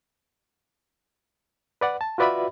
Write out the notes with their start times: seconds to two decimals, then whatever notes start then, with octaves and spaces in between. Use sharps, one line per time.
1.81 B4 D5 F#5
2.01 A5
2.18 F4 F#4 B4 D5 E5 B5